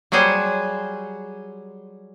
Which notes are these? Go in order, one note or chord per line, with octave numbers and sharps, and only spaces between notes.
F#3 G3 F#4 G#4 C5